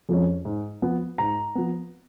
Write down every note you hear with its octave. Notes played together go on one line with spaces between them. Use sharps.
F2 F3 G#3 C#4
G#2
F3 B3
G#2 A#5
F3 B3